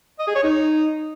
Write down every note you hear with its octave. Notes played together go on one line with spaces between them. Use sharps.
D#5
G#4
C#5
D#4